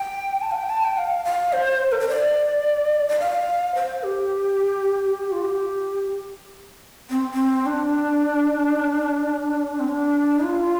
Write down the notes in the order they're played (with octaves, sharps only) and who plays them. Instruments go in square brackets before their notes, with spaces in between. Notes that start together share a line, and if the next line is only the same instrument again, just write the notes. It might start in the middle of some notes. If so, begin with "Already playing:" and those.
Already playing: [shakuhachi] G5
A5
F5
G5
A5
G5
F5
F5
C5
A4
C5
D5
D5
F5
C5
G4
F4
G4
C4
C4
D4
C4
D4
F4